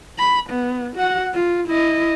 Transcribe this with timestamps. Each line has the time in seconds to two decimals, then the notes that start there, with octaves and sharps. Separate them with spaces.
0.19 B5
0.49 B3
0.96 F#4 F#5
1.34 F4
1.68 E4 D#5